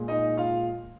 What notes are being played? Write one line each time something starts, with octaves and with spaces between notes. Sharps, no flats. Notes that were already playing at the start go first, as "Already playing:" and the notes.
Already playing: A#2 G#3
D#4 D#5
F4 F5